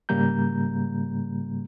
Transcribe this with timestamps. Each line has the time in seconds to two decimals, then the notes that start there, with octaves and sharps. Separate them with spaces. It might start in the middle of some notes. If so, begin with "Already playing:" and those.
0.09 G#2 C#3 G3 A#3 A#5 G6